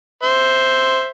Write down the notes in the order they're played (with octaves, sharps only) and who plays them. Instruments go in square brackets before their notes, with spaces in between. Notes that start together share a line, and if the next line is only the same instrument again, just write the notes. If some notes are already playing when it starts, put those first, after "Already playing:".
[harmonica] C5 E5